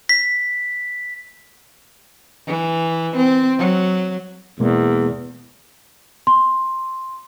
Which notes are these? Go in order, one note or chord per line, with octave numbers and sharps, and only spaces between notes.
B6
E3
C4
F#3
E2 B2 G#3 A#3
C6